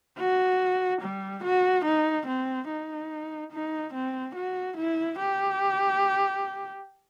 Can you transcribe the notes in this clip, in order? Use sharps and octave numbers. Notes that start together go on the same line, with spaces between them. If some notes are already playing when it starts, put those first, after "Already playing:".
F#4
G3
F#4
D#4
C4
D#4
D#4
C4
F#4
E4
G4